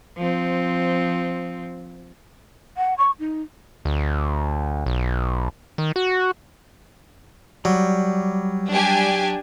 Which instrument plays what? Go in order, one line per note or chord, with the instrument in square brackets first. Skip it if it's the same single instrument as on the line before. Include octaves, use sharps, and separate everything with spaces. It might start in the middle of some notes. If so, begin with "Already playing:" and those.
[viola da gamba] F3 C4
[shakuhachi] F#5
C#6
D#4
[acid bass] D2
B1
D#3
F#4
[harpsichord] F#3 [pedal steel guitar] G3
[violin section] D4 G4 G#5